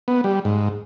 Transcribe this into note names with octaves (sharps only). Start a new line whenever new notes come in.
B3
G3
G#2